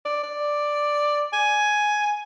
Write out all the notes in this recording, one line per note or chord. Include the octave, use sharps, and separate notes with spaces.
D5
D5
G#5